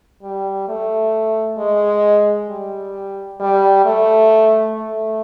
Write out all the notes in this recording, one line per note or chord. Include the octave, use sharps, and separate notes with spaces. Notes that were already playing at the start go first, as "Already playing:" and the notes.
G3
A3
G#3
G3
G3
A3
A3